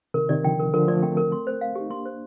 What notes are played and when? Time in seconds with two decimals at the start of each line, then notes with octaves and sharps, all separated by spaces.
0.14 C3 D#3 A#4
0.29 C3 D#3 D5
0.44 D3 F3 G5
0.59 A#4
0.73 D3 F3 A#4
0.88 F3 A3 D5
1.02 A3 C4 G5
1.17 A#4
1.32 C6
1.47 C5
1.61 F5
1.76 D#4 G4
1.90 A#3 D4 C6
2.06 C5